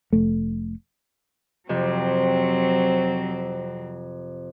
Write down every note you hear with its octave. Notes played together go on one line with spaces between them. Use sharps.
F1 A3
F2 C3 F#3 C4